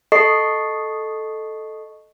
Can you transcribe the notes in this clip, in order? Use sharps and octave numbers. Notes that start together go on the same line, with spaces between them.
A4 D#5 C#6 C7